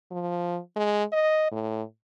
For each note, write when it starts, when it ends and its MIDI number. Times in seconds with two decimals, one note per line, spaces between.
0.11 0.59 53
0.76 1.04 56
1.13 1.49 75
1.52 1.83 45